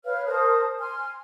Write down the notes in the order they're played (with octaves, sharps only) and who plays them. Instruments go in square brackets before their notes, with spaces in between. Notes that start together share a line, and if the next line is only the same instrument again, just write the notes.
[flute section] B4 C#5 F5 F6
A#4 C5 A5 D#6
G#5 C6 F6